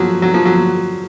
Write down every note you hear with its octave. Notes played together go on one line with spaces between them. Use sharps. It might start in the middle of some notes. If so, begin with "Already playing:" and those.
Already playing: F3 F#3
F#3
F3
F#3